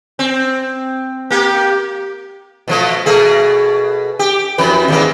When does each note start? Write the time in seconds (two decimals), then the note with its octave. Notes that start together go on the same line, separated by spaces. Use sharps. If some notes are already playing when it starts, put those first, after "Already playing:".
0.19 C4
1.30 A#3 G4
2.68 B2 F3 A3
3.06 B2 A3 G#4
4.19 G4
4.58 F2 E3 B4
4.88 D#2 G#2 A#3